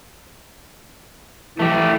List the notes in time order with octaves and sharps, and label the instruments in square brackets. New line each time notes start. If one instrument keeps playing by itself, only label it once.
[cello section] E3 [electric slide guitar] A3 G4